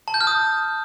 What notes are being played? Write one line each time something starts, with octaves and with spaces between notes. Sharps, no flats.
A5
G6
F6
D#6